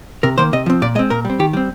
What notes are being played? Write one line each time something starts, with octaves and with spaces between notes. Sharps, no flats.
C3 A#4
D#3 A#3 C5
C3 D#5
F3 C4
A#2 D5
G#3 C4 D#5
A#2 A#4
G3
C4
D#3 G4
G3 C4